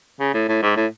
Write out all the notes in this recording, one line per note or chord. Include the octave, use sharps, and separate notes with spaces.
C#3
A2
A2
G#2
A2